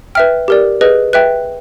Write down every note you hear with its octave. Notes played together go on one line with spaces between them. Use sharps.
B4 E5 G5 F6
G4 A#4 D5
G#4 B4 D#5
B4 E5 G5 F#6